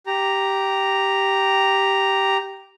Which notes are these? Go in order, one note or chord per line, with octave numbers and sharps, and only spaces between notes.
G4 A#5